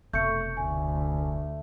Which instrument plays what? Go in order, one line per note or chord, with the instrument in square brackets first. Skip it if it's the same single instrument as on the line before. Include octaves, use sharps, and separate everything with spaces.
[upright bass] F1 B2 [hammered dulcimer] A3 [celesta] G6 C#7
[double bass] D2 [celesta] G#5